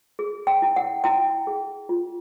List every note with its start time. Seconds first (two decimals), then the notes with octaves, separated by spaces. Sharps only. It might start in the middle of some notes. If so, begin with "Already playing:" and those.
0.19 G#4
0.47 G5
0.62 E4
0.76 F#5
1.04 E4 G5
1.47 G#4
1.89 F4